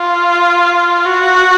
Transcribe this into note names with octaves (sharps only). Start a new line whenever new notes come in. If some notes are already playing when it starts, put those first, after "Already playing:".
Already playing: F4
F#4